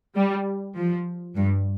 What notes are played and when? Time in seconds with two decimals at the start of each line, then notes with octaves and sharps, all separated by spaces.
0.16 G3
0.76 F3
1.36 G2